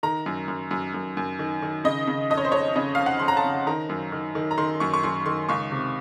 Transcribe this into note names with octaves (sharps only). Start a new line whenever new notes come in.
D#3 A#5
F#2
F#2
F#2
F#2
F#2
D#3
D#3
C#3 D#5
C#3
F2 D#5
C#5
C5
F2 C#5
C#3 D#5
F2 F5
F#5
F2 C6
A#5
A5
C#3
D#3 A#5
F#2
D#3
D#3
A#5
D#3 C6
F#2 C#6
C#6
F#2 C6
D#3 C6
C#2 C#6
C3